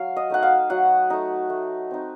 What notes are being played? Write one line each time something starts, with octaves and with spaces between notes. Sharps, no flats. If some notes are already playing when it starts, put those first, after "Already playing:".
Already playing: F#3 F5
D#5
A3 D#4 F#5
F5
F#3 F#5
A3 D#4
A3
C4 D#4